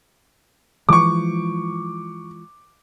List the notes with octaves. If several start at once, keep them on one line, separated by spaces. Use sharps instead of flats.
E3 F3 G#3 C#6 D6